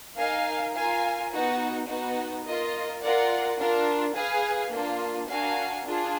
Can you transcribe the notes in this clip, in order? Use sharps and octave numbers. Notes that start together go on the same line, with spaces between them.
D#4 A#4 F5 G#5
F4 A#4 F5 G#5
B3 D#4 F#4
B3 D#4 F#4
F4 A#4 D#5
F4 A#4 D5 F#5
D4 F4 A#4
G#4 B4 F5 G#5
A#3 D4 F4
D4 F#4 A#4 F5 G#5
D4 F4 G#4